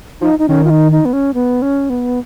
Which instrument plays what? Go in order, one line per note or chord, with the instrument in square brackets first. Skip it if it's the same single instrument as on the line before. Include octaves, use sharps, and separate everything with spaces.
[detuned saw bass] F3 [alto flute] D#4
[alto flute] D#4
[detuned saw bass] D#3 [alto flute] C#4
[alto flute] F4
D#4
D#4
B3
C#4
B3
C#4
B3